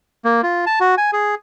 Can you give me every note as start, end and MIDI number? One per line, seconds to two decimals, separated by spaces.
0.25 0.41 58
0.43 0.65 65
0.67 0.79 81
0.80 0.95 66
0.98 1.11 80
1.13 1.35 68